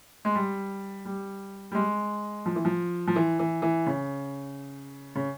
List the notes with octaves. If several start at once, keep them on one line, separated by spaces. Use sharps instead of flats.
G#3
G3
G3
G3
G#3
F3
E3
F3
F3
E3
E3
E3
C#3
C#3